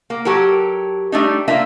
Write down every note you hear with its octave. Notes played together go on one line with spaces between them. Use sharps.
A#3
F#3 G4 A4 A#4
G3 A3 D4 D#4
A3 A#3 D4 F4 E5